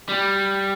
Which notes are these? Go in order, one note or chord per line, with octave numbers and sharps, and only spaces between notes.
G3